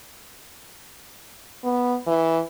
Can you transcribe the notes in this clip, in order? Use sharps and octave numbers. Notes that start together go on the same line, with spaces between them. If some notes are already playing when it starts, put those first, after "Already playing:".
B3
E3